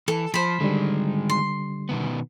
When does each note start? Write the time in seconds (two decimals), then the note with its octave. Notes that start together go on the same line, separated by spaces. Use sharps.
0.08 E3 A4
0.34 F3 C5 B5
0.60 D3 D#3 G3 G#3
1.30 C6
1.89 B2 D#3 B3